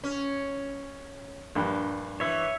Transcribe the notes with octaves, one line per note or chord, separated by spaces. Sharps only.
C#4
A#1 G2
E3 C#5 E5